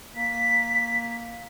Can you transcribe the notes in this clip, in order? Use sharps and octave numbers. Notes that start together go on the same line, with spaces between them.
A#3 B6